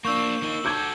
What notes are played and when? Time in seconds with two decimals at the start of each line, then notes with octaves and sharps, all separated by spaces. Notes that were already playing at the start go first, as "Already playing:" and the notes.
0.05 A#3 D4 C#6 E6 G6 E7
0.43 A#3 D#4 G7
0.65 F#4 A4 D6 G6 G#6